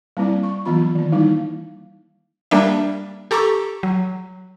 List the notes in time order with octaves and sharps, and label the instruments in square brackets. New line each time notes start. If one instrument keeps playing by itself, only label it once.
[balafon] G3 A#3 C4 E4 D5
C#6
E3 F#3 B3 F4 B5
D#3 A#3
G3 A#3 D#4 E4
[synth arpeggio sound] G3 A#3 D4 E5
G4 A4 A#5 C#6 D6
F#3